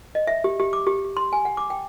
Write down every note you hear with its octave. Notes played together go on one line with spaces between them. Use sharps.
D#5
E5
G4
G4
D6
G4
G4
C6
G#5
F#5
D6
G5